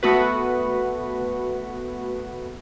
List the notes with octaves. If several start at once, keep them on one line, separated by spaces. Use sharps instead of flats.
A3 B3 F#4 B4